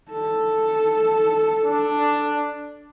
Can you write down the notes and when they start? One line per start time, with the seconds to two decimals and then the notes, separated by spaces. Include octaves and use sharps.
0.10 A4
1.66 D4